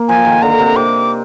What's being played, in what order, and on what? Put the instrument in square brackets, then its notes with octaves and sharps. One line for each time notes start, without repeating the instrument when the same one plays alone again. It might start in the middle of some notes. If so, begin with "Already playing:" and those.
Already playing: [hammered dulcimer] A#3
[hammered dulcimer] F3 [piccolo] G#5
[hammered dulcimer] D#3
[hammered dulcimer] D3 [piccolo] A#5
[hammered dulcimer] C3
[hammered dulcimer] C3 [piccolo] D6